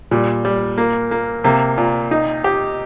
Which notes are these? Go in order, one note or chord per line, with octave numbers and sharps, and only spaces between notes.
A#2 G3
G3
A#3
A#3
C3 A#3
A#2
D#4
G4